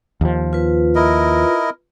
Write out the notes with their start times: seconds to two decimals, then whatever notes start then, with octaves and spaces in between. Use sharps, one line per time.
0.21 D#2 F3
0.53 F4 B4
0.95 E4 A#4 D#5